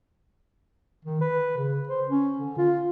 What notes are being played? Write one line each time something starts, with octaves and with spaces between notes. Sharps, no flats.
D#3
B4
C#3
C5
C#4
D3
F4